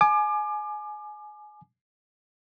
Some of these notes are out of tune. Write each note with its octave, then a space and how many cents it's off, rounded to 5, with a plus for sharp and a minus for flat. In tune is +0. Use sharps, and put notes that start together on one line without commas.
G#5 +25 D6 +30